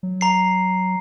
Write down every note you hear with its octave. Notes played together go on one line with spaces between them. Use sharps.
F#3
A#5 C7